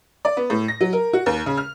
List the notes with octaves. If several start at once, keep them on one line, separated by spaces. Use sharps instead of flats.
D5
B3
A2
A#6
F#3
A#4
F#4
D#2
C#3
F6